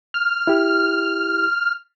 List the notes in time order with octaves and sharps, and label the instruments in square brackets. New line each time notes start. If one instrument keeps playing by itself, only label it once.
[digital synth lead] F6
[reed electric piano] E4 G4